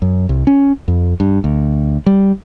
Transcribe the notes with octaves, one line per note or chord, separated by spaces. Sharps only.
F#2
C2
C#4
F2
G2
D2
G3